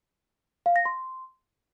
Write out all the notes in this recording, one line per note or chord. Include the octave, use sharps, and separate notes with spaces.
F5
A#6
C6